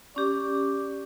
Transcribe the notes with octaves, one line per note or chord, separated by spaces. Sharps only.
C#4 G4 D5